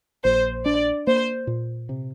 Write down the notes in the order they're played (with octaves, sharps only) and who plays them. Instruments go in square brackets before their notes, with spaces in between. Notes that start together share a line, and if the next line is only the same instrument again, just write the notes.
[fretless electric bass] A#1 [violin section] C5
[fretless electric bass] D4 [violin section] D5
[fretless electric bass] A#3 [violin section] C5
[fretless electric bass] A#2
C3